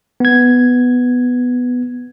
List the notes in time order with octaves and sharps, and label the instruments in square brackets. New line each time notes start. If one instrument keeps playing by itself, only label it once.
[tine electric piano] B3 G#6